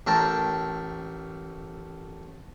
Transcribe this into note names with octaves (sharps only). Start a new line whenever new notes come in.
A1 A3 A#4 G5 A5